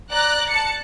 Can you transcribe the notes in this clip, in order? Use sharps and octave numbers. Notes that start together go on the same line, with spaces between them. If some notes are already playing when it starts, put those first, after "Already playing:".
D5 A#5 F#6
A5 C#7